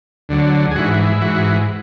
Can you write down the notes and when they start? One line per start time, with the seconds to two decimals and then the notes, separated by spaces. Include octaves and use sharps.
0.29 D2 D3 F#3
0.71 G#4
0.76 G#2 E3 F#4
1.13 E4
1.21 G#2 E3 F#4